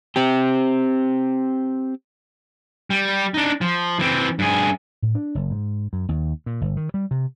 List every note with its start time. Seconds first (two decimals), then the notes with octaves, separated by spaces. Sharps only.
0.16 C4 G4
2.90 G3
3.34 D4 D#4
3.61 F3
3.99 E3 C4
4.39 G2 G#4
5.02 A2
5.15 D4
5.35 F#1
5.51 G#2
5.93 F#2
6.09 D#2
6.46 A#2
6.61 G1
6.77 D#3
6.94 G3
7.11 C3